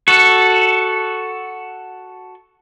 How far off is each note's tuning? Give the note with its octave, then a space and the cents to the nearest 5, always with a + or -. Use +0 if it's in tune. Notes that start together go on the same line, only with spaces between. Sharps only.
F#4 +0 A4 +0